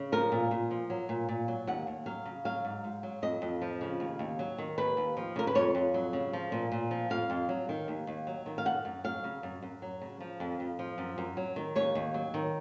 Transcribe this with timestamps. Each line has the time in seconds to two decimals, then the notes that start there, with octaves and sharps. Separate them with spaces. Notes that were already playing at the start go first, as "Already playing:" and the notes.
Already playing: C#3
0.12 F3 A#4
0.32 A#2
0.51 A#2
0.71 F3
0.90 F#3
1.09 A#2
1.29 A#2
1.48 F#3
1.67 D#2 F#5
1.87 D#2
2.06 F#3 F5
2.25 C#3
2.45 F#3 F5
2.65 G#2
2.84 G#2
3.03 F#3
3.22 F2 D#5
3.42 F2
3.62 F3
3.81 C#3
4.00 D#2
4.19 D#2
4.39 F#3
4.58 D#3
4.78 D#2 B4
4.97 D#2
5.17 F3
5.36 C#3 A#4
5.47 B4
5.55 F2 C#5
5.75 F2
5.94 F#3
6.13 C#3
6.33 F3
6.52 A#2
6.72 A#2
6.91 F3
7.10 F2 F5
7.30 F2
7.49 F#3
7.69 D#3
7.88 D#2
8.07 D#2
8.27 F#3
8.46 D#3
8.58 F5
8.65 F#2 F#5
8.85 F#2
9.04 F#3 F5
9.24 C#3
9.43 F#2
9.62 F#2
9.82 F#3
10.02 C#3
10.20 F3
10.40 F2
10.60 F2
10.79 F3
10.98 F#2
11.18 F#2
11.37 F#3
11.56 D#3
11.76 D#2 C#5
11.95 D#2
12.14 F#3
12.34 D#3